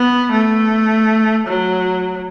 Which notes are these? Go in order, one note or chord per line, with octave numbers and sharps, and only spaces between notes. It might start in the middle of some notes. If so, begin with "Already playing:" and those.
Already playing: B3
A3
F#3